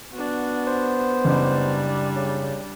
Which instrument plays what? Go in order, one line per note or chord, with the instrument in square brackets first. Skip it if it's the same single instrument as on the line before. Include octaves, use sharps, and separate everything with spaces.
[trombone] B3 [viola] D4 F#4
[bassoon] C5
[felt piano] F#1 [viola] G3 D4
[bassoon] C#3